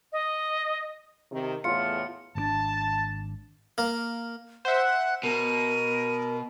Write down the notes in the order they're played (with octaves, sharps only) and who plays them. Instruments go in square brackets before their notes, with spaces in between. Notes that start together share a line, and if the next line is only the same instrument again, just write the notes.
[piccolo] D#5
[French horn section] C3 D#3
[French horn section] E2 A2 [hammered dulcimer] F4 [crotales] C#7
[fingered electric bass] G#1 C3 D4 [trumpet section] A5
[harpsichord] A#3
[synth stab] C5 E5 [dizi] F#5
[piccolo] F#6
[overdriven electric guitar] B2 [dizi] A#4 [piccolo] D#7